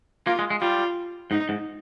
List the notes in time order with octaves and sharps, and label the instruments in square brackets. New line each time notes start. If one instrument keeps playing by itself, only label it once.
[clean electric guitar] A#3 [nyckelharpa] F4
[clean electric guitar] G#3
G#3
[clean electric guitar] G3 [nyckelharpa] F4
[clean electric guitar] G#2 [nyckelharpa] D#4
[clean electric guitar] G#2